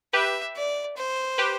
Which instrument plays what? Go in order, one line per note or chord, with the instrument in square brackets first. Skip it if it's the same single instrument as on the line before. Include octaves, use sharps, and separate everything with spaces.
[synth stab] G4 B4 [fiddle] E5
[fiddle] D5
C5
[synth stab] G4 B4